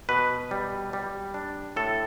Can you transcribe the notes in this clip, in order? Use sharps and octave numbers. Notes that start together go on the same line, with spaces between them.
B2 B4
G3
G3
D4
A2 A4